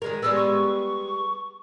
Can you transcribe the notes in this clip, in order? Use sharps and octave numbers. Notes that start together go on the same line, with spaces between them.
D#3 G#3 A#4
G3 G#3 B3 E6
C#6